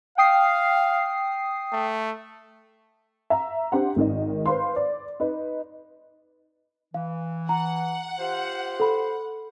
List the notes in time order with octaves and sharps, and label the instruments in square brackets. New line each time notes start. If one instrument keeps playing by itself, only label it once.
[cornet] F5 [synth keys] G5 D#6 C7
[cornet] A3
[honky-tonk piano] E5 A#5
D4 G4 C5 F#5
G#1 D#3 D#5
B4 C5 F5 C6
D5
D#4 B4 D#5
[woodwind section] E3 [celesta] F5
[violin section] F#5 [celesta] A#5
[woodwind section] F4 G4 C5
[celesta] A4 B5